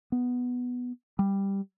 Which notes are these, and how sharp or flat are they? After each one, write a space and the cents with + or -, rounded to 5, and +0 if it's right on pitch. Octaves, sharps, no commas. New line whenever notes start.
B3 +0
G3 +5